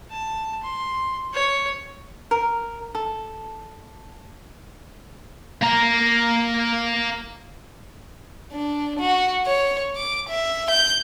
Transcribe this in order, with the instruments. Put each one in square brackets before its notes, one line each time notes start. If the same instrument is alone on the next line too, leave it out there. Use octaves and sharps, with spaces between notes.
[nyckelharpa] A5
C6
C#5
[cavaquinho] A#4
A4
[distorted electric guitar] A#3 A#5
[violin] D4
F#4
C#5
D6
E5
G6